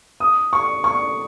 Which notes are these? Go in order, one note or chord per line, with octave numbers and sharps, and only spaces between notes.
D#6
C#6
C#6